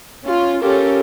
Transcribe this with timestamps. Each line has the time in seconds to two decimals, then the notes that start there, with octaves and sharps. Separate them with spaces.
0.24 C#4 F4
0.61 C#4 F4 G4 A4 A#4